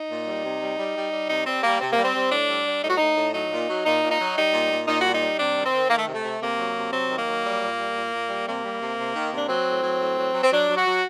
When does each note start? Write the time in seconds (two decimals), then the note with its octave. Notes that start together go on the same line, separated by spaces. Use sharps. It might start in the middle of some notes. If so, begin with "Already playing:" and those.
Already playing: D#4
0.10 A#2
0.27 G3
0.44 C3
0.61 G3
0.78 G3
0.96 G3
1.12 G3
1.29 C3 D#4
1.46 G3 C4
1.63 G3 A#3
1.81 C3 C4
1.93 A#3
1.98 G3
2.04 C4
2.14 G3
2.31 A2 D4
2.48 G3
2.66 G3
2.83 A2 D#4
2.90 F#4
2.98 A2 D#4
3.16 A2
3.34 F#3 D#4
3.51 A#2
3.68 F#3
3.85 A#2 D#4
4.02 A#2
4.11 D#4
4.20 F#3
4.36 G3 D#4
4.54 A#2
4.70 A#2
4.87 A#2 D#4
5.01 G3 F#4
5.14 D#4
5.22 G3
5.39 C3 D4
5.56 D#3
5.65 C4
5.73 D#3
5.90 D#3 A#3
5.98 A3
6.07 C3
6.14 A3
6.24 C3
6.41 C3 A#3
6.58 F#3
6.75 C3
6.92 F#3 C4
7.09 D#3
7.18 A#3
7.27 F#3
7.44 G3
7.61 A#2
7.78 G3
7.95 A#2
8.12 A#2
8.29 G3
8.46 C3 A#3
8.64 G3
8.81 C3
8.97 C3
9.14 D#3
9.32 C3
9.38 D4
9.49 F#3 C4
9.66 A2
9.83 F#3
10.00 A2
10.17 F#3
10.34 F#3
10.43 C4
10.51 F#3 D4
10.68 F#3
10.77 F#4
10.85 F#3